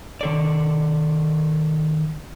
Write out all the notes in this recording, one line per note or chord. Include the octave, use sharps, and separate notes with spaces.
D#3 A4 D5